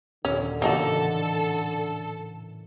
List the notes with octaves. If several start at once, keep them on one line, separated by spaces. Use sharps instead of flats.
D#2 A#2 D3 F#3 C#4
A2 C#3 E3 A#3 D#4 F#4 A4